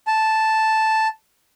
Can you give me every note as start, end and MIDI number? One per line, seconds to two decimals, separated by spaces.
0.07 1.08 81